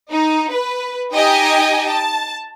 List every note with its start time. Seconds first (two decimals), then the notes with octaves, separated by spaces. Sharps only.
0.12 D#4
0.52 B4
1.13 D#4 G4 D#5 G5 G#5
1.90 A5